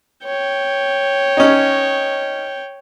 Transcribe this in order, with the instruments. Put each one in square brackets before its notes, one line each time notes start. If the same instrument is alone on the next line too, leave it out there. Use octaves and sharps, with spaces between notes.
[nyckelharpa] C#5 G5
[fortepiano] C#4 D#4